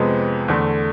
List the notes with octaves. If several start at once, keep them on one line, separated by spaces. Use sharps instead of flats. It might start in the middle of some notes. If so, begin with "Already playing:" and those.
Already playing: F2 C3 G#3 B3
E2 D3 A3